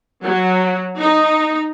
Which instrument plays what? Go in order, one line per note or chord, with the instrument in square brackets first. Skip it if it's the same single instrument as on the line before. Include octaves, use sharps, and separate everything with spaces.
[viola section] F#3
D#4